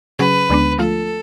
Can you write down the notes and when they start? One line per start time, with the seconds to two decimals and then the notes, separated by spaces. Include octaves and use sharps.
0.19 C#3 F#3 C#4 G#4 B4
0.49 D2 D3 G#3 B3 D4
0.79 F3 A3 F4 A4